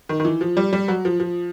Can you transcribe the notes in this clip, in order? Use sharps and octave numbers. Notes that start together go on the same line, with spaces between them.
D#3
D#3
E3
F3
G3
G3
F#3
F3
F3